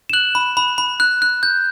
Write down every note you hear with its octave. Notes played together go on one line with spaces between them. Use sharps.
E7
F#6 F#7
B5
B5
B5
F#6
F#6
G6